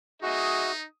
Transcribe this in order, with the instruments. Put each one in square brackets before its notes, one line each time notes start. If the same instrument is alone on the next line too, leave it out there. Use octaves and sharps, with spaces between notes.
[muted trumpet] D#4 [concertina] F#4 [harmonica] G#4 D#5 E5 [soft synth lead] D#6